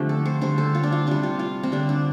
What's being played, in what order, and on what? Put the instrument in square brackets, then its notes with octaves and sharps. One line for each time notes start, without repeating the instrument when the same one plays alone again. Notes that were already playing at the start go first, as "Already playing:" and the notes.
Already playing: [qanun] D3 F3 A3 C4 D4 G4
A4
C5
D3 G3 C5
A4
F4
D4
F4
C3 G3 D4
F4
F4
C4
D3 G3 D4
D4